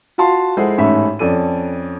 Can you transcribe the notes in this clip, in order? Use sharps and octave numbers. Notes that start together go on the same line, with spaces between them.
F4 F#4 F5 A5 C6
G#3 E4 G#4 A4 C5 F#5
A1 G#2 A3 C#4 E5 B5
F2 C#4 A4 D5 D#7